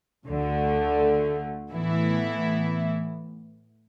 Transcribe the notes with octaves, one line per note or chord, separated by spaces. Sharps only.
D2 D3 A3
A2 E3 B3 E4